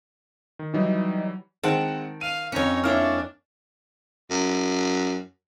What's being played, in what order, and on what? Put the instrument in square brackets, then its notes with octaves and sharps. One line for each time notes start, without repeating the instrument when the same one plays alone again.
[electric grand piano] D#3
[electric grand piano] E3 F#3 G3 [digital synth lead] D#4
[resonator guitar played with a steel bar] D#3 [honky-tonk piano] G#3 C4 F#5 [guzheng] A5
[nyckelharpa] F5 [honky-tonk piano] D#7
[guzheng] F2 C#4 [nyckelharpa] D#4 C#5
[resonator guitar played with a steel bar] A#3 E4 C#5 [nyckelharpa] D4 [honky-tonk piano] F6
[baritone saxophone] F#2